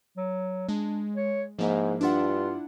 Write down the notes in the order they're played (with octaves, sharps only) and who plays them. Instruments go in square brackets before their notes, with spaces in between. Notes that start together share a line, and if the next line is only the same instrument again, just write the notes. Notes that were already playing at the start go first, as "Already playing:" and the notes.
[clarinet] F#3
[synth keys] G#3 [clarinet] D4
[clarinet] C#5
[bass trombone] G#2 [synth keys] F3 A#3 E4 [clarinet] G#3
[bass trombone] G2 [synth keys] D4 E4 F#5 [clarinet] F4